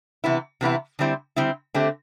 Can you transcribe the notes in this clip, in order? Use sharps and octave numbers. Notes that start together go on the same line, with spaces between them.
C3 E3 B3 E4
C3 E3 B3 E4
D3 G3 C4 E4
D3 G3 C4 E4
D3 A3 C4 G4